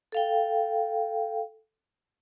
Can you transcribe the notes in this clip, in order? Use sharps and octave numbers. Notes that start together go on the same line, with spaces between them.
A4 F5 G5